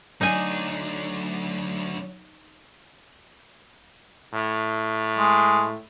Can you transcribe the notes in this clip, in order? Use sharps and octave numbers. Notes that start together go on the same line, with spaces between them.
D2 F#3 D4 D#4 G#5
A2
G#3